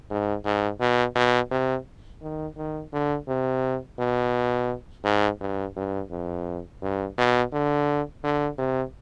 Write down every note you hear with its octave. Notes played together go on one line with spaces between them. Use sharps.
G#2
G#2
B2
B2
C3
D#3
D#3
D3
C3
B2
G#2
G2
G2
F2
G2
B2
D3
D3
C3